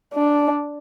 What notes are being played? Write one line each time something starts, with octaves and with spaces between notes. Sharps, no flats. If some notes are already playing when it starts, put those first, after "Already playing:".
D4